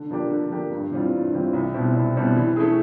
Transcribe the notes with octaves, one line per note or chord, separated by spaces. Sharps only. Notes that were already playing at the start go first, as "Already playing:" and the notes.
Already playing: D3
F3 A#3 D4 G4
D3
F3 A#3 D4 G4
G2
E3 G3 C4 F4
G2
E3 G3 C4 F4
C2
B2 G3 C4 E4
C2
B2 G3 C4 E4
E3
A3 C#4 E4 G#4